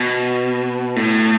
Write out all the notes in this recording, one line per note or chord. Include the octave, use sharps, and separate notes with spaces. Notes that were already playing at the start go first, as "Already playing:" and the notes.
Already playing: B2
A2